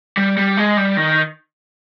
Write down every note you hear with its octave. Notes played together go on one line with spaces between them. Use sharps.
G3
G3
G#3
G3
D#3